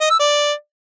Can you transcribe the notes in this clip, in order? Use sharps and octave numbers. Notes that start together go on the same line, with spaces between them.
D#5
E6
D5